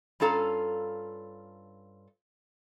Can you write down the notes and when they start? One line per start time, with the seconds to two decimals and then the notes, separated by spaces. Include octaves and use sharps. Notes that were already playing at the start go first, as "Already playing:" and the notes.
0.20 G2 C#4 F4 A4 F5 A#5